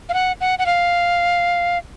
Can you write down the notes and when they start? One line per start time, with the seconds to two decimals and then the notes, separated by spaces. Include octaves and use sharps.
0.09 F5
0.14 F#5
0.41 F#5
0.59 F#5
0.66 F5